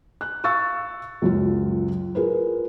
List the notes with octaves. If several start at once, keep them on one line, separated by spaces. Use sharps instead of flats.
F#6
F5 C#6 E6 A6
C#2 F#2 F4
F4 G#4 A#4 B4